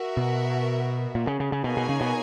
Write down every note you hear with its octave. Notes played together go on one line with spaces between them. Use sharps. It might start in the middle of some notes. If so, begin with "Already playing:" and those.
Already playing: F#4 A#4 E5
B2
A#2
C#3
C#3
C#3
B2 A#3 D#4 G#4 C#5 G#5
B2
C#3
B2